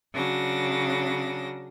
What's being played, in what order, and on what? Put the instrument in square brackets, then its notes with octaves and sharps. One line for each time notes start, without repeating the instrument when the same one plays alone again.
[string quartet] C#3 F#3 D4 A#6